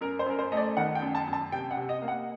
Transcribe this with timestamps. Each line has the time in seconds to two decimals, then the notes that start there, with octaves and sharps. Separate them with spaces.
0.01 F#2 A#4
0.19 C5
0.26 F#2 A#4
0.39 C5
0.52 A3 D#5
0.57 D5
0.77 D#3 F#5
0.95 G5
1.02 F#2
1.15 A5
1.27 F#2
1.33 A5
1.52 C3 G5
1.71 F#5
1.77 C3
1.89 D#5
2.02 A#3
2.08 F#5